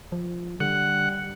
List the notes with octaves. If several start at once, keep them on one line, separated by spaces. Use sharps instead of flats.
F3
D3 G3 F#5